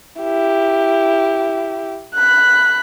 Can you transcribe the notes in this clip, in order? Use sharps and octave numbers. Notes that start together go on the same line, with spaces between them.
E4 G4
B5 F#6